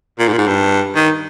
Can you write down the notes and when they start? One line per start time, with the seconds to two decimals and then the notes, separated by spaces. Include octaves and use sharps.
0.19 A#2
0.28 G#2
0.33 A#2
0.38 G#2
0.47 G2
0.95 D#3